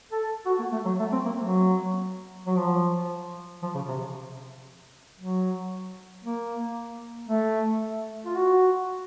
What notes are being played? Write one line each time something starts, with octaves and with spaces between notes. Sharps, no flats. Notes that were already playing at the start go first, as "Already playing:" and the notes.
A4
F#4
A#3
A3
F#3
A3
C4
A#3
F#3
F#3
F3
F3
C#3
C3
F#3
A#3
A3
F4
F#4